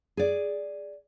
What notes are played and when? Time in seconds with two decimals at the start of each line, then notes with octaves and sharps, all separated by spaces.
0.17 G#4 D5